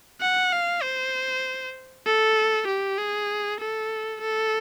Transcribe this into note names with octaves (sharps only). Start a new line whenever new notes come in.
F#5
F5
C5
A4
G4
G#4
A4
A4